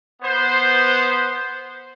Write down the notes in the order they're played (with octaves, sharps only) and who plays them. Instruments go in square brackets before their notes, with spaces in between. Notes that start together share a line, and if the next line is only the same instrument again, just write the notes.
[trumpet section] B3 C5